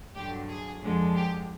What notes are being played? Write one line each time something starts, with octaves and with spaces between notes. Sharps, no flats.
G2 D3 F#3 G4
G#4
F2 D3 F3 G#3
G4